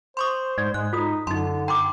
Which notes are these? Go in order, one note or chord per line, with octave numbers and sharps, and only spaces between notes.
C5 C6 C#6 D#6
G#2 D5
G#2 G#3 F#6
D#4 F4 A4 D#6
F#2 D3 D#4 A5 C6
G5 A#5 C6 D6